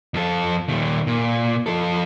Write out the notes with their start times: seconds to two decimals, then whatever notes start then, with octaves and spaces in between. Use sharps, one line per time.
0.14 F2 A4
0.68 A#2 D#3
1.07 A#2
1.66 F3 A4